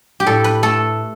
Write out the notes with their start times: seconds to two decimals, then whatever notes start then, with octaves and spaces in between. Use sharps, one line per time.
0.20 G4
0.26 A2 A4
0.44 B4
0.63 A3 A4